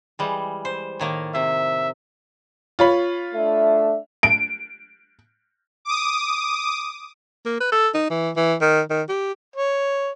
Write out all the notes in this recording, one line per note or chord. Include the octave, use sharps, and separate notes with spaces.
E3 G3 G#3
C5
A2 D#3 A#3
C3 E5
F4 C#5 B5
A3 D4 E5
D7
D6 D#6
A#3
B4
A4
D#4
E3
E3
D#3
D#3
G4
C#5